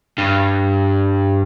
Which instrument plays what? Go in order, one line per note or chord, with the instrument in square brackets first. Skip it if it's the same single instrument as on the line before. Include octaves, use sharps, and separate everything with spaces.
[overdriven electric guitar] G2